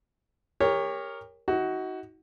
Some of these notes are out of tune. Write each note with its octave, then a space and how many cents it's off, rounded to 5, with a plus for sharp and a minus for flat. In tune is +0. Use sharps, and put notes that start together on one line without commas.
G4 +35 A#4 +0 C#5 +0
D#4 +40 F#4 +15